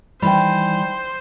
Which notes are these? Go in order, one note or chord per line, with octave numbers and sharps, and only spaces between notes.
D#3 E3 G3 E4 C5 G5 B5